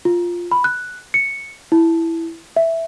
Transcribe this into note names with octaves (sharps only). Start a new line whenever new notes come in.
F4
B5
F#6
C#7
E4
E5